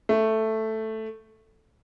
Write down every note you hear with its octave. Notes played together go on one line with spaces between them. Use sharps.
A3